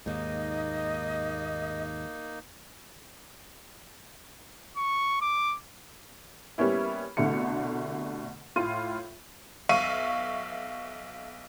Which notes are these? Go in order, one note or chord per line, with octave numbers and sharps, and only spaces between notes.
D#2 G#2 A#3 D#4 D#5
C#6
D6
G3 A#3 B3 C#4 E4
C2 B2 D3 A3 C#7
A2 F4 C6 D#7
B1 E5 F5 C#6 D#7